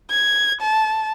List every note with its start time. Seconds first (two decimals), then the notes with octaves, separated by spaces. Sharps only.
0.10 G#6
0.61 A5